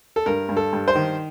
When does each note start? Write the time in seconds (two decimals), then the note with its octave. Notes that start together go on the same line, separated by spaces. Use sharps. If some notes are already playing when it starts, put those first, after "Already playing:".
0.16 A4
0.26 G2 A#4
0.49 G2
0.57 A4
0.73 G2
0.88 C5
0.95 D#3